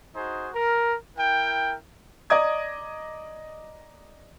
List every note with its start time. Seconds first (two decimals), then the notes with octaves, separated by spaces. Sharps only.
0.15 D#4 F#4 G#4 C5
0.54 A#4
1.16 E4 A#4 G5
2.30 D5 D#5 A#5 D6 D#6 G#6